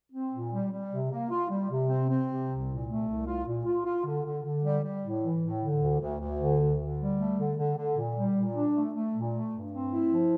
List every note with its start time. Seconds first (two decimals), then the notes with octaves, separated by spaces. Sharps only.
0.12 C4
0.32 A#2
0.52 G3
0.71 G3
0.91 C3
1.11 A#3
1.30 F4
1.49 G3
1.69 C3
1.88 C4
2.08 C4
2.28 C3
2.48 C2
2.67 A#2
2.87 A3
3.06 C2
3.26 F4
3.45 A#2
3.65 F4
3.85 F4
4.04 D3
4.24 D3
4.43 D3
4.63 G3
4.82 G3
5.02 A2
5.22 E3
5.41 A2
5.61 D3
5.80 D2
6.00 D2
6.20 D2
6.39 D3
6.59 D2
6.78 D3
6.98 G3
7.17 A3
7.37 D3
7.57 D3
7.76 D3
7.96 A#2
8.16 G3
8.35 A#2
8.55 D4
8.74 A3
8.94 A3
9.13 A#2
9.33 A3
9.53 G2
9.72 C4
9.91 E4
10.11 F3